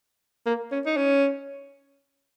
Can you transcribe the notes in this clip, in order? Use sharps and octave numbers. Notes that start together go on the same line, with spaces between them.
A#3
C#4
D#4
C#4